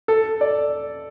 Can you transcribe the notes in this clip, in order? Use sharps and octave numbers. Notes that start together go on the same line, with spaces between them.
A4
D5